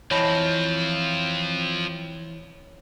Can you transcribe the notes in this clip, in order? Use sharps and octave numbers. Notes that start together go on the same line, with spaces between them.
E3 F3 C4 C#5 D#5 A5 B5